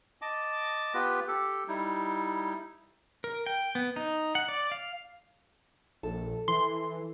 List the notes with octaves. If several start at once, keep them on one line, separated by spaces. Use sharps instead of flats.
D#5 A5 D6
B3 F4 G4 B4
G4 A4
G3 D#4 E4
A#4
G5
B3
D#4
F#5
D5
F5
A#1 A4
E3 C6